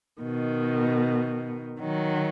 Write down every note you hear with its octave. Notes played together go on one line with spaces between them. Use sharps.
B2 D#3
D#3 F#3